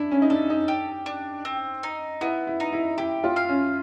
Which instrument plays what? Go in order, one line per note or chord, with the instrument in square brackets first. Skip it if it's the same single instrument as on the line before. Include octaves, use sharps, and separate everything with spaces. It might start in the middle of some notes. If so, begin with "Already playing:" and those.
Already playing: [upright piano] D4 [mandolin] E4
[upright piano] C#4
D#4
[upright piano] D4 [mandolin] A4
[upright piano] D#4
[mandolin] G4
D4
C4
D#4
[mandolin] B3 [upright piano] E4
[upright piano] E4
[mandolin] D#4
[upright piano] E4
[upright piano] E4 [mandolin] G4
[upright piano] F4
[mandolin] F5
[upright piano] C#4